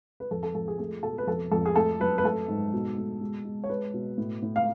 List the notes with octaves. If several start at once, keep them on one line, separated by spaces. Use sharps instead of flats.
B4
F2 A4
A4
F2 A4
G#4
A3 G#4
B2 A4
B4
F2 A4
F2 A4
G#4
A3 A4
F#2 B4
B4
A3 A4
G#2
B2
A3
G#3
G#3
C#5
G#3 B4
B2
A2
A2
F5